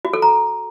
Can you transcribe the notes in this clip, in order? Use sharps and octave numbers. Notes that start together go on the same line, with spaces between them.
F#4
A4
A#5